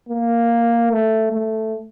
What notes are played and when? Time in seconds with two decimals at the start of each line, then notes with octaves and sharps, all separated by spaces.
0.09 A#3
0.91 A3
1.33 A3